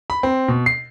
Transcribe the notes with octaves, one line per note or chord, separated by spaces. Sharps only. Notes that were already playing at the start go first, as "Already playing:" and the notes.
B5
C4
B2
C7